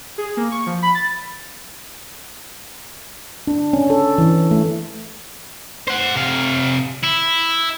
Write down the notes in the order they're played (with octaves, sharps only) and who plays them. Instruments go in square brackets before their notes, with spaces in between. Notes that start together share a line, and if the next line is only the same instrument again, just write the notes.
[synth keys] G#4
A#3
C#6
F3
B5
A6
[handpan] D4
C#4
A4
E3
A3
[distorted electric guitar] C5 F#5
C3 F5
E4